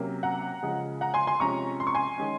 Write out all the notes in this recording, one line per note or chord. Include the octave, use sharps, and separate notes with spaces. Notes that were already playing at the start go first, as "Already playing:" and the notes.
Already playing: C3 F#3 A#3 C#4
F#5 A#5
C#3 F3 G#3
F#5 A#5
G#5 C6
G#5 C6
C3 F3 G#3 C#4 A#5 C#6
C6
C#6
G#5 C6
D#3 G#3 C#4